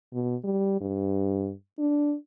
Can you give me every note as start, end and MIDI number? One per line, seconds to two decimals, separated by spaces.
0.13 0.35 47
0.44 0.79 55
0.81 1.52 43
1.79 2.14 62